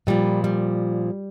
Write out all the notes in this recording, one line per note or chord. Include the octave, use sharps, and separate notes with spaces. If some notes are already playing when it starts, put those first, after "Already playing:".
A#2 F3 G3
G3